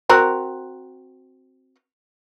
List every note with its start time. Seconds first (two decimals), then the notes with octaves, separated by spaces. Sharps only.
0.09 C4 F#4 A#4